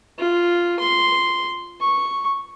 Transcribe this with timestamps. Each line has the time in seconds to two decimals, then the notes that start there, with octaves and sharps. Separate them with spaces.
0.19 F4
0.79 C6
1.80 C#6